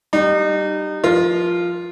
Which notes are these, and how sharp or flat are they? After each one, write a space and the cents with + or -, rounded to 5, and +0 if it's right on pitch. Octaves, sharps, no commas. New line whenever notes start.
G3 -10 D#4 -30
F3 +0 F4 +0 A#4 +30